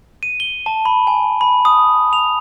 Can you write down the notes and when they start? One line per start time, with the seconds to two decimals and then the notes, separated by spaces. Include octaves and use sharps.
0.23 D#7
0.40 G7
0.66 A5
0.86 B5
1.07 G#5
1.41 B5
1.65 D#6
2.13 F7